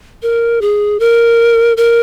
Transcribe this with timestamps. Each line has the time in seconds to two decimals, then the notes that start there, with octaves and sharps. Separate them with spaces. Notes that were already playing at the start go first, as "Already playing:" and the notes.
0.22 A#4
0.61 G#4
1.00 A#4
1.77 A#4